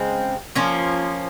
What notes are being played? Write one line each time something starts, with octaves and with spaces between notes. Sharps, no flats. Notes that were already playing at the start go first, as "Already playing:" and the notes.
Already playing: C#3 G#3 C4
F3 A#3 C#4